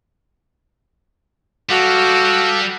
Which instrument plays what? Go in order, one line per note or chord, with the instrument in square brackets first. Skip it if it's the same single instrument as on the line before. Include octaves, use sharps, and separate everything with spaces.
[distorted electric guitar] G3 [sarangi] F#4 [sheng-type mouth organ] A4 F5 F6